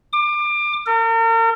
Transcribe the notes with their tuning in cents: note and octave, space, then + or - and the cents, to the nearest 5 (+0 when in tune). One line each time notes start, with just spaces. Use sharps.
D6 +30
A#4 -40